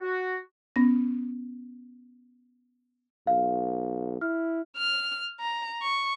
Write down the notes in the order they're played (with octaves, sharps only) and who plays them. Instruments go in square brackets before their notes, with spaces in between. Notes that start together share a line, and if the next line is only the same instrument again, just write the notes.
[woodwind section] F#4
[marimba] B3 C#4 A#6
[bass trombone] B1 [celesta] F5
[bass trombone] E4 [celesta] F6
[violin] F6
A#5
C#6